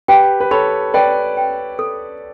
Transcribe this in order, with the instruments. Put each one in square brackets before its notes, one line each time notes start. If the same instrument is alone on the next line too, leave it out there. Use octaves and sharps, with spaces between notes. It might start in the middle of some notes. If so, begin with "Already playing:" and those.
[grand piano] G4 B4 [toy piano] G5
[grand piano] B4
[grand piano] A4 C#5 [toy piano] B5
[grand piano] B4 D5 [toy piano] G5
[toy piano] G5
A4